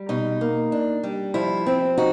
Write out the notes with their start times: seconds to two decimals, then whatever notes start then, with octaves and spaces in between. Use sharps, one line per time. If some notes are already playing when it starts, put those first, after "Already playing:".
Already playing: G3
0.09 B2 D#4
0.41 A#3
0.72 D4
1.03 G3
1.34 F3 E4
1.66 C4
1.98 D#4 F#4